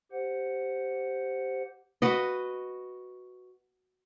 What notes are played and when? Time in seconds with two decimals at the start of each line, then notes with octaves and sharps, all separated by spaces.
0.12 G4 C5 F#5
2.02 F#4 B4 D#5